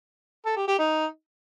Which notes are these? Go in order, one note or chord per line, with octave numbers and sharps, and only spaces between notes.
A4
G4
G4
D#4